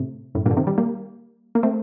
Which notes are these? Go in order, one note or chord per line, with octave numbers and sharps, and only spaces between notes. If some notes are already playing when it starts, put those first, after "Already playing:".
Already playing: A2 C3
F#2 A2
G2 A#2
D3
C3 D#3
D#3 G3
G3 A#3
A#3
A3 C4